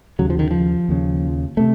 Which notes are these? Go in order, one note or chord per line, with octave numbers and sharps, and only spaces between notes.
D#2 C#3 F#3
F3
D#3
F3
D#2 C#3
C3 A3